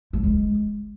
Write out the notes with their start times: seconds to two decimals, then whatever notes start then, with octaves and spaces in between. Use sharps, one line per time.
0.13 A3
0.24 G#3